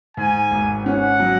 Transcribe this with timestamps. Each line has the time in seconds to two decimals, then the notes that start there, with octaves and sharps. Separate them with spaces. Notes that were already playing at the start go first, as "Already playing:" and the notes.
0.17 G#2 G#5
0.51 G#1
0.85 C#4 F#5
1.20 F#3